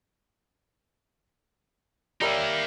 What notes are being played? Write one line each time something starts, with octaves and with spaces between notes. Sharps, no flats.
G3 A#3 D#4 A#4 E5